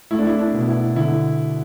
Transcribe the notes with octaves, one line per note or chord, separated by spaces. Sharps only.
A3 E4
D4
E4
D4
B2
E4
D3 E4